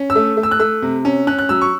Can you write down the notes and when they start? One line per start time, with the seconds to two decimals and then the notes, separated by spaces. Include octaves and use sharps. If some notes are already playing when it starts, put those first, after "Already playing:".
Already playing: C#4
0.10 E6
0.15 A3
0.37 A3
0.43 E6
0.51 F#6
0.59 A3 E6
0.82 C3
1.05 C#4
1.27 C#4 F#6
1.38 F#6
1.49 F#3 E6
1.61 C#6